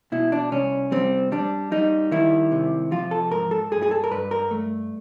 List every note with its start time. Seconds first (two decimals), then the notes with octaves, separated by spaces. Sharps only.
0.12 B2 E4
0.32 D4
0.52 C2 C#4
0.92 G3 C4
1.32 G3 D4
1.72 G3 D#4
2.11 D#3 E4
2.52 C3
2.91 F3 F4
3.11 A4
3.31 G#2 A#4
3.51 A4
3.71 G2 G#4
3.83 G#4
3.91 A4
4.04 A#4
4.11 G2 B4
4.31 A#4
4.51 A3